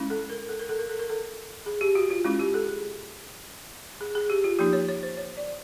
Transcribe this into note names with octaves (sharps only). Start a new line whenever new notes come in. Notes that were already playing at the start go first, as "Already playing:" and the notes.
Already playing: G#3 C#4 E4
A4
A#4
A4
A#4
A4
A#4
A4
A#4
A4
G#4
G4
F#4
F4
G#3 C#4 E4 F4
G4
A4
G#4
G#4
G#4
G4
F4
F3 A#3 D#4 G4
C#5
C#5
C5
C#5
D5